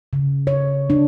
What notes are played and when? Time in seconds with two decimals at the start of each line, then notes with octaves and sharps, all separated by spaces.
0.13 C#3
0.47 C#5
0.90 D4